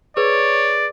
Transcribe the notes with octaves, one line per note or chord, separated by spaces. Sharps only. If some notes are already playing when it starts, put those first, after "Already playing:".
G#4 B4 C#5 D5